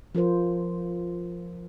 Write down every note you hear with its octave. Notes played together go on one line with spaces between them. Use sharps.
F3 F4 A#4 C5